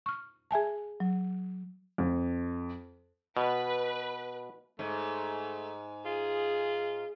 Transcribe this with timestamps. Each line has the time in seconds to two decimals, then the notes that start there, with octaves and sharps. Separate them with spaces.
0.06 C#6 F6
0.51 G#4 E5 G#5 A5
1.00 F#3
1.98 F2
3.37 B2 B4
4.79 G#2 A3
6.05 F4 G#4